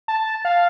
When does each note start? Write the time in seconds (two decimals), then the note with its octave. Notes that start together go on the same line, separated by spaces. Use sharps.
0.08 A5
0.45 F5